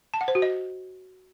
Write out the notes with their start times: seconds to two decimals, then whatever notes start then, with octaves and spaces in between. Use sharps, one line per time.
0.14 A5
0.21 F#5
0.28 C5
0.35 F#4
0.42 D#5